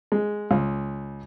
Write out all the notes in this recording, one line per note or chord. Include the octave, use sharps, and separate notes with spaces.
G#3
C#2